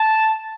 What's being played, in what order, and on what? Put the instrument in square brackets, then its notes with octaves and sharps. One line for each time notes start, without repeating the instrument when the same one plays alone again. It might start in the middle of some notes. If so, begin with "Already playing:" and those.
Already playing: [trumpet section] A5